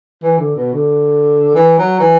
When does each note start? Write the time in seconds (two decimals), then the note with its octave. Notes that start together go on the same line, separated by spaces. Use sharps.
0.23 E3
0.39 D3
0.56 B2
0.73 D3
1.55 E3
1.78 F#3
2.00 E3